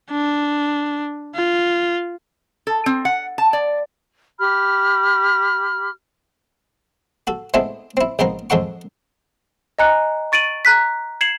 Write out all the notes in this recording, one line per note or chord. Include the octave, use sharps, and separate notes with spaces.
D4
F4
A4
C4
F#5
A5
D5
G4 B5 F6
F#4 A4
G#3 A3 B3 C4 D4 E4
C4 E4
A#1 G#3 B3 C4 D#4 A#4
F2 F3 G#3 A4 F#5 C#6
D#5 G#5 A#5 F#6 C#7
C#6 A6 D7 D#7 F#7
A#5 F#6 B6
G#6 C7 C#7 E7 F#7